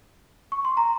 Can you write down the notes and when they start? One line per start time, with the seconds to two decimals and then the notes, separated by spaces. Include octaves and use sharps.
0.52 C#6
0.65 C6
0.77 A#5